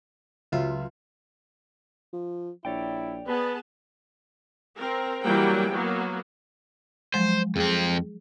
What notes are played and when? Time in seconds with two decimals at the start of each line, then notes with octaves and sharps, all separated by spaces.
0.52 C#2 F#3 F4 E5
2.13 F3
2.65 A#1 E4 C#5 D5 G5
3.27 B3 G#4 B4 A5
4.77 C4 A#4
5.24 E3 F#3 G3 A#3 F#5 G5
5.72 F#3 A#3 B3 F#4
7.14 F3 F#3 G#3 C5
7.56 F2 C4 G#4